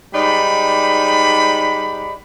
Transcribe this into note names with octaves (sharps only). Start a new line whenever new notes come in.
G#2 G3 D#4 D5 B5